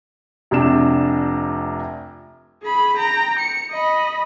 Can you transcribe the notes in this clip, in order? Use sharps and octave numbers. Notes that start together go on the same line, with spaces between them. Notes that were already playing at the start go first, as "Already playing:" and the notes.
F1 C3 D4 E7
G#4 B5
G5 A#5
C#7
D#5 B5